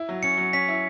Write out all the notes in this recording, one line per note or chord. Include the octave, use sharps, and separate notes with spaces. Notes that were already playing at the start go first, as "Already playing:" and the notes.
Already playing: E4
F#3
C#4 C#7
F#3
C#4 B6
E4